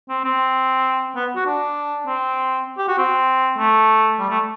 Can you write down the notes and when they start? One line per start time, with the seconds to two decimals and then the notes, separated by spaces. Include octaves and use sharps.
0.09 C4
0.24 C4
1.16 B3
1.36 F#4
1.46 D4
2.07 C4
2.78 G4
2.88 F#4
2.98 C4
3.58 A3
4.19 G3
4.30 A3